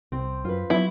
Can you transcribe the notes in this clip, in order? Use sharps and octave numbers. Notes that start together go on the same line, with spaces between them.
C2 C4
F#2 F4 B4
F#3 B3 E4